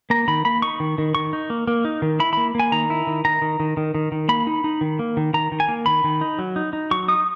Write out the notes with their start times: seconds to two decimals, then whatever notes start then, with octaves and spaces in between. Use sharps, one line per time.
0.10 A#3 A#5
0.28 D#3 B5
0.45 A#3 B5
0.62 D#4 C#6
0.80 D#3
0.98 D#3
1.15 D#3 C#6
1.33 D#4
1.50 A#3
1.67 A#3
1.85 D#4
2.02 D#3
2.20 E4 B5
2.33 A#3 B5
2.55 A#3 G#5
2.72 D#3 A#5
2.90 E4
3.07 D#3
3.25 D#3 A#5
3.42 D#3
3.60 D#3
3.77 D#3
3.95 D#3
4.12 D#3
4.29 A#3 B5
4.47 D#4
4.64 D#4
4.81 D#3
4.99 A#3
5.17 D#3
5.34 D#3 A#5
5.52 D#3
5.60 G#5
5.68 A#3
5.86 D#3 B5
6.04 D#3
6.21 D#4
6.39 F#3
6.56 D#4
6.73 D#4
6.91 F#3 C#6
7.08 D#4 D#6